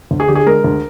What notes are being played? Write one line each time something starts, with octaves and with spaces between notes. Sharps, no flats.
D2
G#4
D3 G4
G#4
G#3 A#4
D2